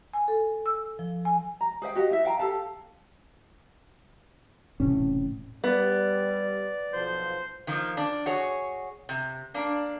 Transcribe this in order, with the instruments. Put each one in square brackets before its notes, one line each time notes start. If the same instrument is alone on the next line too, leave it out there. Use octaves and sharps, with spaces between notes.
[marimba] G#5
A4
E6
F3
G#5
[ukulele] A#5
G#4 C5 E5 G5
F#4 G4 D#5 F5
E4 C5 E5
F5 G5 A5 A#5
G4 A4 F5 A5
[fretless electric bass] E1 A2 C3 C#4
[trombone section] G3 [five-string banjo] B3 [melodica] D5
[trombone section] B1 F3 [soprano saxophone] C5
[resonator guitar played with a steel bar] D#3 F3 A#3
D4
F#4 G#4 C#5
C3
A#3 D4